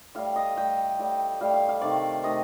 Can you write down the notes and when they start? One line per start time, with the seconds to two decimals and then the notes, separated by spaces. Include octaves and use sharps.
0.15 A2 G3 F5
0.36 D#5
0.57 A2 G3 G5
0.99 A2 G3
1.41 A2 G3 F5
1.54 F5
1.69 F5
1.81 C3 D#3 A3 D5
2.23 C3 D#3 A3 D#5